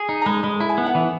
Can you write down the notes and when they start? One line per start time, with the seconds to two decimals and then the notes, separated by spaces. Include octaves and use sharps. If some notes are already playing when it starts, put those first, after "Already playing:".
Already playing: G#4
0.09 D#4
0.21 A#5
0.26 G#3 B5
0.43 G#3 B5
0.60 E4 B5
0.69 G#5
0.78 B3
0.86 F#5
0.95 E3 E5